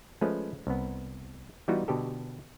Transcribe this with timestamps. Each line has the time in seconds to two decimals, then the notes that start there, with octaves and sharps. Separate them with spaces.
0.21 F3 G#3 A3 C#4 B4
0.67 C2 B3
1.68 E3 G3 B3 D#4 F4 F#4
1.88 B2 D3 G4 A4